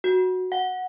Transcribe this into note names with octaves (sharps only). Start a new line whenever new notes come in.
F#4
F#5